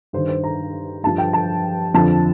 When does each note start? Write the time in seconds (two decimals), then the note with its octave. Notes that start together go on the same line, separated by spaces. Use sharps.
0.13 G2 D#3 C5
0.29 C5
0.44 A#5
1.04 G2 F3 A5
1.18 G5
1.33 A5
1.94 F2 D3 F3 A5